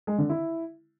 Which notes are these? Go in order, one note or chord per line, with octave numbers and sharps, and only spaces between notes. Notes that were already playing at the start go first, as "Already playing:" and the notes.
G#3
D3
E4